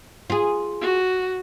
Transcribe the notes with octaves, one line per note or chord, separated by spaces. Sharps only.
F4 G#4
F#4